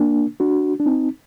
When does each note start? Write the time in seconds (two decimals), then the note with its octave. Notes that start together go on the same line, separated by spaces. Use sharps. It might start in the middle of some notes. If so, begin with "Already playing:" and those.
Already playing: A#3 D4
0.40 D4 F#4
0.80 D4
0.86 C4 D#4